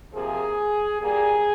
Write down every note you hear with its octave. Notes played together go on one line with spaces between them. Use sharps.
C3 F3 A#3 G#4
A#2 G3 A#3 G#4